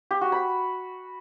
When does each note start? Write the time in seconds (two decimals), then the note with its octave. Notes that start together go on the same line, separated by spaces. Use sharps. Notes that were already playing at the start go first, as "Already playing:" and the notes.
0.11 G4
0.21 F#4
0.32 B5